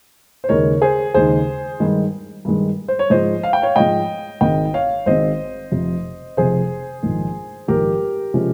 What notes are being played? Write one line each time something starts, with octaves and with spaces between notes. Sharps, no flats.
C5
D#2 C#3 G#3 D#4 A#4 C#5
G#4 C5
D#2 C#3 G#3 D#4 G#4 C5
G2 D#3 G#3
G2 D#3 G#3
C5
C#5
G#2 F3 G#3 C5 D#5
F5
G5
C#5 F5
G#2 F3 G#3 D#5 G5
G#1 G#2 D#3 G#3 C4 D#5 G5
C#5 F5
G#1 G#2 D#3 G#3 C4 C5 D#5
F1 F2 C3
F1 F2 C3 G#4 C5
A#1 G#2 D#3
A#1 G#2 D#3 G4 A#4
C3 F3 G#3 C#4